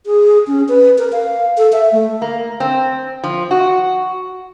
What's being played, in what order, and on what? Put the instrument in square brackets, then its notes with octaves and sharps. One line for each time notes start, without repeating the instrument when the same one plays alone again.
[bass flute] G#4
C#4
B4
A#4
F5
A4
E5
A3
[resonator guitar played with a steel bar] A#3
C4
F3
F#4